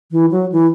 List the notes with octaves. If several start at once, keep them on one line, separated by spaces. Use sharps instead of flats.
E3
F#3
E3